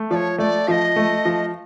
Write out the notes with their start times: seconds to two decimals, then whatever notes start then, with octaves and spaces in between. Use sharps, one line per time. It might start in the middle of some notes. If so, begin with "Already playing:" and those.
Already playing: A3
0.10 F3 C#5 D5
0.38 A3 D5
0.68 F3 D#5 F5
0.96 A3
1.25 F3